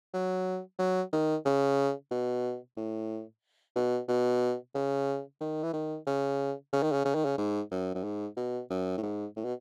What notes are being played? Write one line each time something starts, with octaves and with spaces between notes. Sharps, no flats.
F#3
F#3
D#3
C#3
B2
A2
B2
B2
C#3
D#3
E3
D#3
C#3
C#3
D#3
C#3
C#3
D#3
C#3
G#2
F#2
F#2
G#2
B2
F#2
A2
G#2
A2
B2